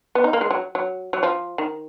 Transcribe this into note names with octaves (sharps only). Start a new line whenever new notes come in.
B3
D#4
A#3
G#3
F#3
F#3
F#3
F3
D#3